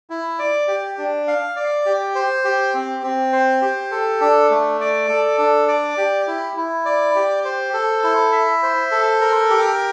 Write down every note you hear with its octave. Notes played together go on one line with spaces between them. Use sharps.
E4
D5
G4
D4
F5
D5
G4
C5
G4
C4
C4
C5
G4
A4
D4
A3
D5
A4
D4
D5
G4
E4
E4
D5
G4
C5
A4
E4
E5
C5
A4
A#4
G4